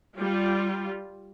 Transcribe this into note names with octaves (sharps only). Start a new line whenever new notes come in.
G3 F4